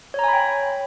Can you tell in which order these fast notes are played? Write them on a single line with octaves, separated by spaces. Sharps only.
C#5 A#5 G#5 B5 G5